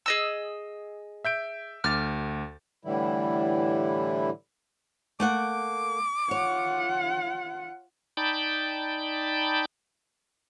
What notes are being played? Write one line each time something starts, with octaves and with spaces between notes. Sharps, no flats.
G#4 D#5 E6
E5 G6 D7
D2 D6 F6 A6
A2 D3 E3 G3 E4
A3 A#3 F#5 D6
F4 C#5 F#5
D#4 D5 G5 A5 B5 G6